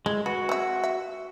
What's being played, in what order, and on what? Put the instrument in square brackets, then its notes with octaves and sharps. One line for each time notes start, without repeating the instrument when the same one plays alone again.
[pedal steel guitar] G#3 [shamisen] E4
[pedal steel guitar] F#4 [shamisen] B4
[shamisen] C4 E5
E5